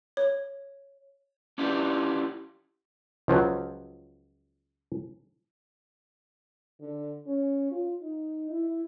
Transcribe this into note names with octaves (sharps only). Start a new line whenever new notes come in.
C#5
C#4 D4 E4 F4 G4 B4
C#2 F3 F#3
D3
C#4
F4
D#4
E4